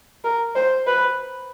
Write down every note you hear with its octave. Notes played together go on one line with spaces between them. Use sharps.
A#4
C5
B4